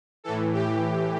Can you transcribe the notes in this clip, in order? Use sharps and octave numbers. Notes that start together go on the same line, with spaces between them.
A2 E3 A4
G4